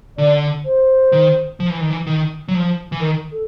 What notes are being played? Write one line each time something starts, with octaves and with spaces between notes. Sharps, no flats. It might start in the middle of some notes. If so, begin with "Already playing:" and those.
D3 D5
C5
D#3
F3
E3
D#3
E3
D#3
F#3
F3
E3
D#3 A#4
A4